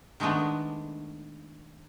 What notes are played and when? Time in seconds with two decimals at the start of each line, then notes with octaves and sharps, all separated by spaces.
0.20 D#3 G#3 A3 B3 D4